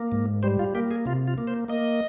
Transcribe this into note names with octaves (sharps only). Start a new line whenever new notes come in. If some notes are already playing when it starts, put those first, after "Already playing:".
Already playing: A#3
G#2
G3 C5
F4
A#3 G4
G#4
C3 F4
F4
A#3
C5
A#3 D#5